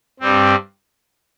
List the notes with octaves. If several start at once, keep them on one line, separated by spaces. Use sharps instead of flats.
G2 G3 C4